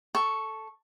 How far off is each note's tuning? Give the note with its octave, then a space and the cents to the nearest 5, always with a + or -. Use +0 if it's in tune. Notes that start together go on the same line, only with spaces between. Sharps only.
A4 +0 C#6 +0